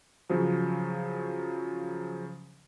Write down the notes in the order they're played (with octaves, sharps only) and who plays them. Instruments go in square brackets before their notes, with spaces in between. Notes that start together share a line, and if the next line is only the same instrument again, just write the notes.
[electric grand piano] C#3 F3 F#3